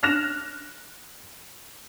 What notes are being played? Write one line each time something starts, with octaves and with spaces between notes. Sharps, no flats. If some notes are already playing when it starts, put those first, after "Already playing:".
F6 F#6 A#6 E7 F7